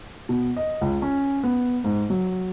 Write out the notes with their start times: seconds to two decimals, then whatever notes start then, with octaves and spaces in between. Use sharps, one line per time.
0.29 B2
0.57 D#5
0.81 C#2
1.02 C#4
1.43 B3
1.84 G#2
2.10 F#3